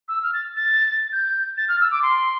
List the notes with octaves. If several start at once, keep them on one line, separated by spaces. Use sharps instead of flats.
E6
F6
A6
A6
G6
A6
F6
E6
D6
C6